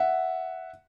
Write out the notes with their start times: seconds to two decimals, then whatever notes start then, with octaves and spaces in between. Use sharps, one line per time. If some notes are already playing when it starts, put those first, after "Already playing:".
Already playing: E5 F#5